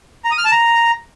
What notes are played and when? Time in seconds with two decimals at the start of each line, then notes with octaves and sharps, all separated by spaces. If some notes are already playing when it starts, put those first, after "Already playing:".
0.25 A#5
0.31 D#6
0.38 F6
0.45 A5
0.52 A#5